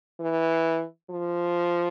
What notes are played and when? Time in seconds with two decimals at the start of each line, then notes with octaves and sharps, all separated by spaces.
0.20 E3
1.10 F3